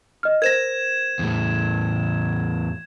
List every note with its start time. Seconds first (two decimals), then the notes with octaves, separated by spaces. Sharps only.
0.23 D#5 F6
0.42 A#4 C5 G#6 A#6 E7
1.19 E2 A2